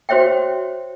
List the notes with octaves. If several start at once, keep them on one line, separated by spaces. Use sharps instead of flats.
F#4 C5 C#5 E5 G5